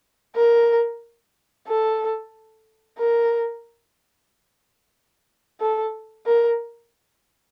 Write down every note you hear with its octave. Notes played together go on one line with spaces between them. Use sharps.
A#4
A4
A#4
A4
A#4